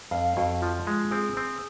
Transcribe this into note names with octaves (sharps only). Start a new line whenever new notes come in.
F2 F5
F2 F#4
F3 F4
G#3 F4
C4 G#4
C4